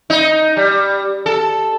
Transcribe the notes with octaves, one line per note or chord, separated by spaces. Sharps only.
D#4
G3
A4